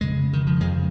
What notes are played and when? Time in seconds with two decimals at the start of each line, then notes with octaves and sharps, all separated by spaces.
0.01 F2 C#3 G#3
0.33 D#3
0.47 F3
0.60 F2 C#3 G#3